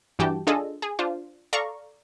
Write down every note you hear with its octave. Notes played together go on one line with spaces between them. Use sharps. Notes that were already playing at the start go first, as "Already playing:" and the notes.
G2 E3 F#4 G4 G5 A5
D4 F4 G#4 A4 D#5
G#4
D4 F4 C5
A4 D5 F5 A#5 C#6